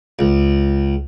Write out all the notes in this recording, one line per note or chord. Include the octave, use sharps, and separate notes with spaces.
C#2